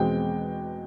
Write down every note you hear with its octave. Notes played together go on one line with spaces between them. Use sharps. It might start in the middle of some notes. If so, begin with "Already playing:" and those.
Already playing: E2 B2 G#3 C4 G5